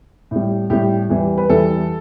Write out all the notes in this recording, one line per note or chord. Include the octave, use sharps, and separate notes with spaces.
A2 G3
A2 G3 G4
E2 E3 G3
B4
E2 E3 G3 A4